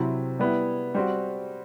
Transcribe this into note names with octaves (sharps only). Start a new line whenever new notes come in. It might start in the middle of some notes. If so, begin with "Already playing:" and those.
Already playing: C3 F#3 C4 E4
G3 B3 E4
G3 C4 F#4